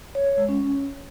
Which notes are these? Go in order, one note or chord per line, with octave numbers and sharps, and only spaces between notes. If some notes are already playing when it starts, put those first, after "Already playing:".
C#5
C#5
G#3
C#4